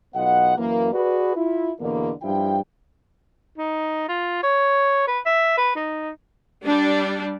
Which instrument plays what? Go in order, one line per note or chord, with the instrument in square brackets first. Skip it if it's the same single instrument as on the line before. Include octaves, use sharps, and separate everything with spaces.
[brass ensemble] B1 B3 F4 D#5 F#5
F#2 E3 A#3
F#4 G#4 B4 D5
E4 F4
E2 B2 D3 A#3
G2 F3 E4 F4 G5
[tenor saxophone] D#4
F4
C#5
B4
E5
B4
D#4
[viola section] G3 D4